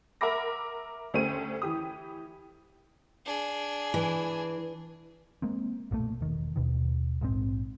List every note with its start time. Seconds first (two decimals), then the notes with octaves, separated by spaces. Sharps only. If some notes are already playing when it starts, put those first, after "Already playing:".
0.21 A#4 E5 F#5 B5 D6 A#6
1.14 D2 A3 C#4 G4 C5 D#7
1.62 E3 G4 D#6
3.26 D4 G#4
3.94 E3
5.42 G#3 A#3 C4
5.91 B1 A#2 E3 A3
6.21 E1 D#3
6.56 D#2 B2 D#3
7.21 A#1 G#2 C4